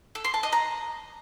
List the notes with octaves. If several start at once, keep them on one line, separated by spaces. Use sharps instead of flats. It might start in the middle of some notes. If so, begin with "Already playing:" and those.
A4
C6
A5
D#5
A#5